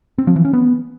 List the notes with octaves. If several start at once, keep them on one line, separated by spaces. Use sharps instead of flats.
C4
F3
E3
C#4
B3